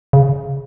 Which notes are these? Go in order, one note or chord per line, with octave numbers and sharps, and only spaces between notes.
C#3